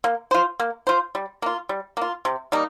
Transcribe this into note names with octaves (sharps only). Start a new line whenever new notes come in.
A#3
F4 C5
A#3
F4 C5
G3
A#3 F4
G3
A#3 F4
C3
G3 A#3 D#4